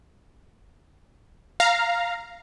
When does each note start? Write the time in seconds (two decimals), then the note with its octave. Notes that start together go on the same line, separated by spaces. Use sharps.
1.60 F5 A#5